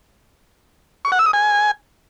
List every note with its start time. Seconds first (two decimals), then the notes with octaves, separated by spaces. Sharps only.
1.05 C#6
1.12 F#5
1.19 E6
1.26 D#6
1.33 G#5